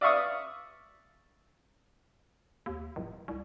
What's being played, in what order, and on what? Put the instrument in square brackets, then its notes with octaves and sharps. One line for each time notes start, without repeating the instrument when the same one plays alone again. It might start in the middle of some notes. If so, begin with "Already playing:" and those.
[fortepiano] D5 E5 F5 C#6 D#6
[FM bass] D#2
D1
C2